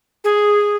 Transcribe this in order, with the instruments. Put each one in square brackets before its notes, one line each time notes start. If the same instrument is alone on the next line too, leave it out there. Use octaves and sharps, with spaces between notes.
[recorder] G#4